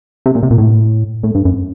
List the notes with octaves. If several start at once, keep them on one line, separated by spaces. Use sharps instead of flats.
C3
A#2
C3
A#2
A2
A2
G2
F#2